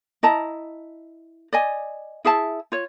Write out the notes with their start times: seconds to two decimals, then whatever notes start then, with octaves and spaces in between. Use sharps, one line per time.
0.23 E4 D#5 A5 A#5
1.53 D5 D#5 G#5
2.25 E4 G#4 E5 A5
2.72 F4 C#5